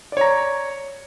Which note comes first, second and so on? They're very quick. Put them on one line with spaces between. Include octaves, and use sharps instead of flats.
D5 C#5 A#5